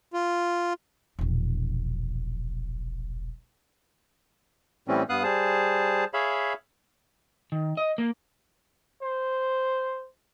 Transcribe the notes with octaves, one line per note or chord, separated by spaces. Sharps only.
F4
E1 A#1
A2 E3 G3 C4 C#4
G2 B3 F5 D#6 F#6
G3 G#4 C5 A5
G#4 C#5 E5 F5 B5
D#3
D#5
A#3
C5